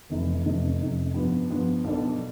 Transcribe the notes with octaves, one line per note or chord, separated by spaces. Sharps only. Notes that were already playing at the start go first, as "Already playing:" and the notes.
F1 F2 C3 E3
F1 F2 C3
F1 F2 C3
G2 F3 B3
G2 F3 B3
B1 B2 B3 D4 A4